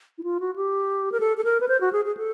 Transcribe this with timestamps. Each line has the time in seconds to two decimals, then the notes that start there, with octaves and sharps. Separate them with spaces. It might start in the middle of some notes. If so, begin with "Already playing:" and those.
0.18 E4
0.23 F4
0.40 F#4
0.56 G4
1.12 A#4
1.20 A4
1.37 A4
1.44 A#4
1.60 B4
1.69 C5
1.81 F#4
1.93 G#4
2.05 G#4
2.17 A4